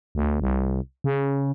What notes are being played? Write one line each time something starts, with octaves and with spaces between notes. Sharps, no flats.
D2
C2
C#3